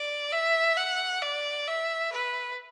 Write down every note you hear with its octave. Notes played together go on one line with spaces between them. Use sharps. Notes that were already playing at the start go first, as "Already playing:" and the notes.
Already playing: D5
E5
F#5
D5
E5
B4